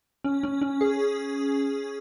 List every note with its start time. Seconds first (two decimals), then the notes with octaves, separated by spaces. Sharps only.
0.24 C#4
0.43 C#4
0.61 C#4
0.81 G#4